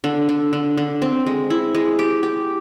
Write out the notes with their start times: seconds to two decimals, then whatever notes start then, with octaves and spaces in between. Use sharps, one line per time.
0.04 D3
0.29 D3
0.53 D3
0.77 D3
1.02 C4
1.26 G#3
1.50 E4
1.75 G#3
1.99 G4
2.23 G4